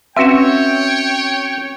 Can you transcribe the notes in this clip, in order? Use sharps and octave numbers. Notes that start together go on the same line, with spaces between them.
C4 C#4 F#4 B4 C#5 E5 G5